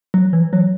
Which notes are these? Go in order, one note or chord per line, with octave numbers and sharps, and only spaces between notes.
F#3
E3
F#3